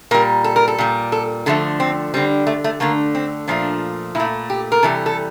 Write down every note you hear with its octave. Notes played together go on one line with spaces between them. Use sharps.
A#2 G3 A#4
A4
A#4
A4
A#2 G3
A4
D3 F3 A3 A4
C4
D3 G3 C4
A3
A3
D3 A3 A#3
C4
A#2 F3 A3 D4
A#2 A3 E4
G4
A#4
C3 E3 G3 A4
A4